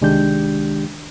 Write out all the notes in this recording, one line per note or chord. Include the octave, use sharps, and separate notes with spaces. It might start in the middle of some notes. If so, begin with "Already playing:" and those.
C2 D#3 G#3 D4 G4 G6